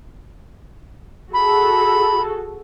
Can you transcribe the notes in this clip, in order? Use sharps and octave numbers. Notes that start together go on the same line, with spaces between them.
F#4 G#4 A4 B5